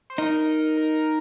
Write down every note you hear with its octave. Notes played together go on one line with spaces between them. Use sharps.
C5
D#4 A#4
A#4